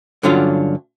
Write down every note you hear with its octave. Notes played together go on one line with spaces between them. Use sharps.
G2 D3 F#3 C#4 F4